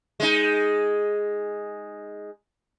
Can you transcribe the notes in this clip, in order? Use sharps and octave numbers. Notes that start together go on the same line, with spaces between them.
G#3 D#4